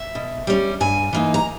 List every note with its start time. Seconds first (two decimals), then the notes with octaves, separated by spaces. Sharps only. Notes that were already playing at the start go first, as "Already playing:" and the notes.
Already playing: E5
0.15 B2
0.47 G3 C#4
0.80 G2 G#5
1.13 E3 A#3 D#4
1.34 A#5